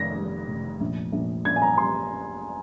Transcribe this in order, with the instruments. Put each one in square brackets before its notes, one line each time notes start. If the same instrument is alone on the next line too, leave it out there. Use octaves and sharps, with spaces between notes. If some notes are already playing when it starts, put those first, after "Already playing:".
Already playing: [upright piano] F1 D#3 A#6
G3
F1
A#1
A#1
A#1 G#6
G#5
A#5
G3 C6